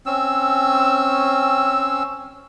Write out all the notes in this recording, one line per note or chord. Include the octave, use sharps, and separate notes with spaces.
C4 C#4 E6